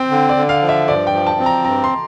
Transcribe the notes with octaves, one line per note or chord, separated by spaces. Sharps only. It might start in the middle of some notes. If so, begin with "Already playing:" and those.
Already playing: C4 G5
D3
D5
D3
F5
F3
E5
G2 D5
G5
F3
A5
C4
A#5
G2 A#5
C6